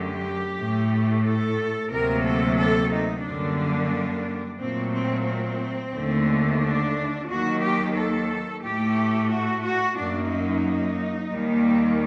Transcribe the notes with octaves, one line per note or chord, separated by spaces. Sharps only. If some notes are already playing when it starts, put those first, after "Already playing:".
Already playing: F#2 D3 F#3 A3 G4
A2 A3
A4
D2 C3 F#3 A#3 A#4
A4
A4
D#4
F#2 D3 G3 A#3 D4
A#2 F#3 A3 C4
C4
C4
D#2 D3 A3
D4
D#2 D#3 F#3 F#4
G4
A4
A2 A3 G4
F#4
F#4
F#2 F#3 A#3 D4
D#4
D#2 D#3 G3 A#3